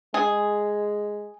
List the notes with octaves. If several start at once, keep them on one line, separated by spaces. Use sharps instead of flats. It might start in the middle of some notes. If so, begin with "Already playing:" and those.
G#3 G#4